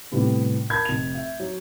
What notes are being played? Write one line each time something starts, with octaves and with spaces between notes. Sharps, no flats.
A2 C3 G3 B3
A#4 A5 B5 G6 G#6
F1 F7
E5
F#3